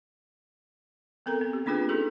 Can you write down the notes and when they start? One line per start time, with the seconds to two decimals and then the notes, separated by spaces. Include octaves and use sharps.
1.26 B3 C4 A4 A#4 A#5
1.41 C4
1.53 G4
1.66 A#3 C#4 D4 F4 G#4 B4
1.89 C#4 D#4 G4 A4